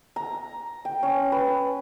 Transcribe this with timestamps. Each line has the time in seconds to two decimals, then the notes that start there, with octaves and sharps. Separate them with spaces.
0.16 A#5
0.85 G5
1.03 C#4
1.32 B4